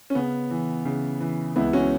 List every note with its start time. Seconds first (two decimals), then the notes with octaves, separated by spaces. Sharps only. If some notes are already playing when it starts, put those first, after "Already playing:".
0.10 C#4
0.15 C#3 B3
0.51 E3
0.85 C#3
1.20 E3
1.56 C#2 B3 E4
1.73 C#4 F#4